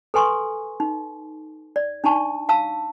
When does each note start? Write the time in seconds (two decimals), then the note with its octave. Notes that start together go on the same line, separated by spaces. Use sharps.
0.14 A4 B4 G#5 C6 C#6
0.80 D#4
1.76 D5
2.04 D4 D#4 A5 C#6
2.49 F5 A5 E6